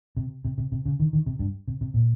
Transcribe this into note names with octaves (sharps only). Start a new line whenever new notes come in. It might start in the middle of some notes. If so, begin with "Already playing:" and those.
C3
C3
C3
C3
C#3
D#3
D#3
C3
G2
C3
C3
A#2